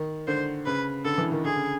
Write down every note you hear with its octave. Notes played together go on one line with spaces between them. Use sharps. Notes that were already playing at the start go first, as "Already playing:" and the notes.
Already playing: D#3
D3 C5
C#3 B4
D3 A4
E3
D#3
D3 G#4
C#3